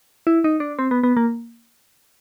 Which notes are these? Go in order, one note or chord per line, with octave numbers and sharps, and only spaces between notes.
E4
D#4
D4
C4
B3
B3
A#3